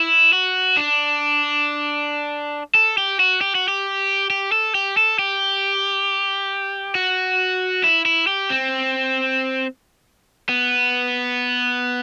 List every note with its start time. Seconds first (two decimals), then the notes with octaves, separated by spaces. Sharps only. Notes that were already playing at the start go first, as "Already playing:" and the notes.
Already playing: E4
0.33 F#4
0.77 D4
2.75 A4
2.98 G4
3.19 F#4
3.41 G4
3.55 F#4
3.68 G4
4.30 G4
4.52 A4
4.75 G4
4.97 A4
5.19 G4
6.95 F#4
7.84 E4
8.05 E4
8.27 G4
8.50 C4
10.49 B3